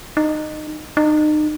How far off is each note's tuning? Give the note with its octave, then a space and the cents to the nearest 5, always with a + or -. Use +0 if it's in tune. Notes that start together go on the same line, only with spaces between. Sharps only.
D#4 -20
D#4 -35